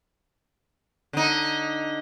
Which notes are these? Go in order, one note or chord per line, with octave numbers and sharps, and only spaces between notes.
D3 D#4